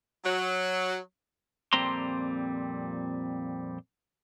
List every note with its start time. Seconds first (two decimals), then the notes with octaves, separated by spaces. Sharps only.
0.25 F#3
1.73 F2 A#2 G3 C4 A#5 C6